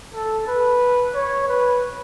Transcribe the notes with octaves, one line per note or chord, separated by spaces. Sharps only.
A4
B4
C#5
B4